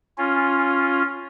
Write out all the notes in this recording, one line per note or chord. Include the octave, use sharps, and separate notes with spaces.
C#4 F4